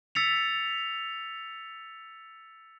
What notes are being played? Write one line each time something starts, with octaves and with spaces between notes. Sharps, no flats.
E6 A6 B6 C#7 F7